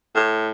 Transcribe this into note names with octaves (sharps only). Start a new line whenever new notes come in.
A2